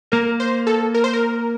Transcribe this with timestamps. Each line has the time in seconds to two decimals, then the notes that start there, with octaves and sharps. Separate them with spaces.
0.12 A#3 A#4
0.40 C5
0.67 A4
0.94 A#4
1.04 C5
1.14 A#4